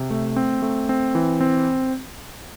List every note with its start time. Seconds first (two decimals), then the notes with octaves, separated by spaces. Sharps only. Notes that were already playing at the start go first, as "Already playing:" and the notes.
Already playing: C3
0.10 A3
0.36 C4
0.62 A3
0.89 C4
1.15 E3
1.41 C4